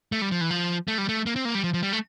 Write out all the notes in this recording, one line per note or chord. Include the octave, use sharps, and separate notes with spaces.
A3
G3
F3
E3
F3
A3
G3
A3
A#3
C4
A#3
G3
F3
F3
G3
A3